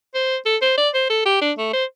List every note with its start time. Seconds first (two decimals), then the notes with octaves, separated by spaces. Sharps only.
0.14 C5
0.45 A4
0.62 C5
0.78 D5
0.94 C5
1.10 A4
1.26 G4
1.41 D4
1.58 A3
1.73 C5